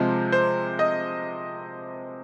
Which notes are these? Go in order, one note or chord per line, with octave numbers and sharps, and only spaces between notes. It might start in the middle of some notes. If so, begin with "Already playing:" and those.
Already playing: C3 F3 G#3 C5
C5
D#5